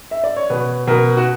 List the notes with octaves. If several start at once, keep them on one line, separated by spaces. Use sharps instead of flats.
E5
D5
C#5
B2 B4
B2 A#4
F#4